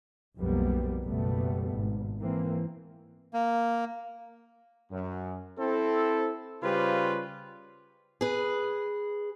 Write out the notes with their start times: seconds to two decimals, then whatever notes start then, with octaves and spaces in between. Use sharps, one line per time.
0.37 B1 F2 A#2 G3 A#3 B3
1.04 F#1 B2 G3 A3 B3
1.73 G#1
2.20 E3 A#3 C4
3.33 A#3
4.91 F#2
5.58 C4 E4 A4
6.62 C#3 G3 F4 G4 B4 C5
8.21 G#4 B4